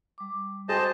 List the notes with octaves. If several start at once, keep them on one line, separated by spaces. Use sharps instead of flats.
G3 D6
F#4 G#4 C5 D#5 G5 A5